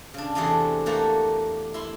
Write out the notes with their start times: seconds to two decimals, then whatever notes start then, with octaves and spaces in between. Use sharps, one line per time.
0.14 C#3 D4
0.35 E2 C3 A3 F#4 G#4 A5
0.86 A3 A#3 F#4 G4
1.74 E4 C6